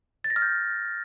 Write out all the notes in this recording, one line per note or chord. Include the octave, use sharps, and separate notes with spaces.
A6
A#6
F6
G6